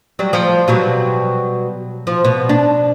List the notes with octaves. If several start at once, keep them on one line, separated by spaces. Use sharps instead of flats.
F#3 G3
F3
B2 F#3 G3
F3
B2
D4